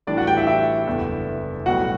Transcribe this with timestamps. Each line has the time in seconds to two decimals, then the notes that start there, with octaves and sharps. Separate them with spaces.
0.07 A1 A2 E3 G3 D4 D5
0.17 F#4 F#5
0.27 G4 G5
0.37 E4 E5
0.47 E4 E5
0.87 F#1 E2 D3 G3
1.66 B1 A2 G3 F#4 F#5